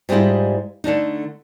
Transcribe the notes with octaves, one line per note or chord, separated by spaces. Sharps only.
G#2 G3 G#3 B3 E4 F4
D3 A3 D4 D#4